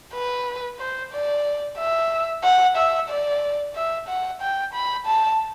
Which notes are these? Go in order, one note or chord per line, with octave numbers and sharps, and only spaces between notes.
B4
C5
D5
E5
F#5
E5
D5
E5
F#5
G5
B5
A5